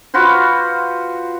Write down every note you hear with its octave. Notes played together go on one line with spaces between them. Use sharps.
F4 F#4 B4 C5